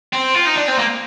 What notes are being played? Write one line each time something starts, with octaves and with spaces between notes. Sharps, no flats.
C4
F4
D#4
D4
C4
A#3